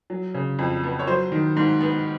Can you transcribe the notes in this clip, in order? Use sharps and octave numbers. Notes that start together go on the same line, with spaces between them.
F#3
C#3
F2
B3
C#5
F#3 C5
D#3
G#2
B3